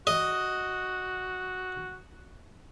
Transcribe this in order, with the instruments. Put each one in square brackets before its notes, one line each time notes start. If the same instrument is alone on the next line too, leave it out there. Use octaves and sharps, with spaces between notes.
[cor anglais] F#4 [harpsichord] D#5